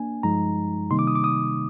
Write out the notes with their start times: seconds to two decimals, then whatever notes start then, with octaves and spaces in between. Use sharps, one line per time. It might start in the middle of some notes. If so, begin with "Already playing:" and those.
Already playing: A#3 D4 G#5
0.23 G2 F3 G#3 D#4 A#5
0.90 C3 D#3 G3 A#3 D#4 C6
0.99 D6
1.07 D#6
1.15 D6
1.24 D#6